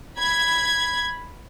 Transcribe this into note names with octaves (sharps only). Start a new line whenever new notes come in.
B5 G#6